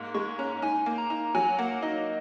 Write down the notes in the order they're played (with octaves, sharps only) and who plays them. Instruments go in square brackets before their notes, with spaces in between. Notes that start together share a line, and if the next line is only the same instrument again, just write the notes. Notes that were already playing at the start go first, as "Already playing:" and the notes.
Already playing: [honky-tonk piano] G#2 A#3
[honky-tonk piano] G#3 [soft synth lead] C#6
[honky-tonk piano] C#4 [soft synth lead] A#5
[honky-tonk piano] D#4 [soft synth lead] G#5
[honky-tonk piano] A#3
[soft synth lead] A#5
[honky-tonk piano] D#4
[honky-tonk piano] F#3 [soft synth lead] G#5
[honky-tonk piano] A#3 [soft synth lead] F#5
[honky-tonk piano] D#4 [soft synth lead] D#5